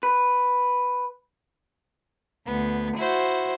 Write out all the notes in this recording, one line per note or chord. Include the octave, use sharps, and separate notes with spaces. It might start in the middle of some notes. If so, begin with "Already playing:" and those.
B4
D2 B3
E4 F#4 C5